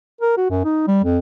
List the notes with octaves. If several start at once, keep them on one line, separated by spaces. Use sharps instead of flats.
A#4
F#4
F#2
D#4
G3
F2